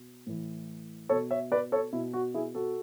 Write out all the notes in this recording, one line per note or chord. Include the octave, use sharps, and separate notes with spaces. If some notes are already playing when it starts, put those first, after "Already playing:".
Already playing: B2
A2 E3
B2 A4 C#5
C#5 E5
B4 D5
A4 C#5
B2 E4
F#4
E4 G#4
F#4 A4